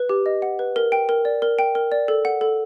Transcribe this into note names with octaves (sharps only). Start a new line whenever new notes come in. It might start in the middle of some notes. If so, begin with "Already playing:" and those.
Already playing: B4
G4
D#5
F#5
B4
A#4
G5
A#4
D5
A#4
G5
A#4
D5
A4
F#5
A4